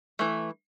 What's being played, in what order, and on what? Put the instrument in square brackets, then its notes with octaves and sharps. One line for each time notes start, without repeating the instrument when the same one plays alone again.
[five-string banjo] E3 A3